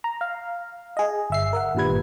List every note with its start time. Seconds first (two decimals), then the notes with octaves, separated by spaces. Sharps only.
0.04 A#5
0.21 F5
0.97 G#4 D#5
1.30 G1 E5 C7
1.53 A#4 E5 F#5
1.75 G#1 G2 A#2 G3 B4 G#6